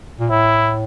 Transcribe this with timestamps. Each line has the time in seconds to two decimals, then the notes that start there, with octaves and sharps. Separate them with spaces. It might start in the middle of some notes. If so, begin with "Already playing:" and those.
0.19 A#2
0.30 A2 E4